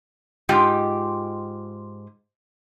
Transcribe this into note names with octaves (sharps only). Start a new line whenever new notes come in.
G#2 G#3 F4 G4 G5